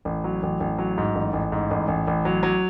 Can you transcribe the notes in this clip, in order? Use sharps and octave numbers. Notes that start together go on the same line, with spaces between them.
A1
F#3
A1
A1
F#3
G#2
A1
A1
G#2
A1
A1
A1
F#3
F#3